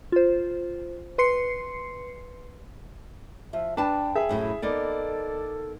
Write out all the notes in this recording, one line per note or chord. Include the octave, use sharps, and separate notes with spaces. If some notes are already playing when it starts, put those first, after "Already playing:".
F4 C5
B4 C6 C7 C#7
F3 E5
D4 B4 G5 A5
G#4 E5
F#2 A2 E4
A#3 B3 D#4 A4 D5